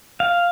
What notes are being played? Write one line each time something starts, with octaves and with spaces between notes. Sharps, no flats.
F5